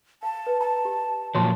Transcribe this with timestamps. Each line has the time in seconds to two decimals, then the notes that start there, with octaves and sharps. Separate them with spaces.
0.23 F5 A5
0.47 B4
0.61 A5 A#5
0.85 G4
1.35 A#2 F3 F#3 C#5 A5 C6